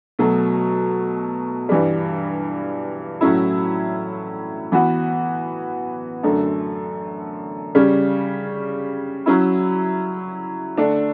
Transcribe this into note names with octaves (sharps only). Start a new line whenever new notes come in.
B2 F#3 A3
G2 E3 G3
A2 F#3 C#4 E4
E3 B3 F#4
F#2 D3 A3
C#3 G3 C#4
F#3 C#4 E4
D3 A3 D4